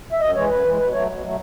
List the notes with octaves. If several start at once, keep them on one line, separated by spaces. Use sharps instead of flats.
E5
F#2 D#5
E3 G#3 C#5
F#2 B4
E3 G#3
B2 B4
F#3 A3 C#5
B2
F#3 A3